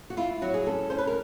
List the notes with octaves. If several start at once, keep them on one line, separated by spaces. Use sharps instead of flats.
F#4
E4 F4
F#3 F#4
G#4
C#4 A4
C#4 C5
B4
A#4